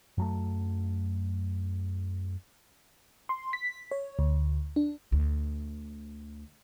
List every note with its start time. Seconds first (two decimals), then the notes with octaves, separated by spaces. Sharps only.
0.18 F#2 F#3 A3
3.29 C6
3.53 B6
3.92 C#5
4.19 D2
4.76 D4
5.12 D2